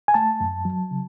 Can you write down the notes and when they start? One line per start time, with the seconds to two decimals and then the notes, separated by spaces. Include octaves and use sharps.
0.08 G#5
0.14 A3 A5
0.40 F#2
0.65 F#3
0.91 C#3